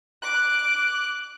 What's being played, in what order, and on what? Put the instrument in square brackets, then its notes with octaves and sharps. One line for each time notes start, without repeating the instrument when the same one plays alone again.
[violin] D6 [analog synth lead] F#6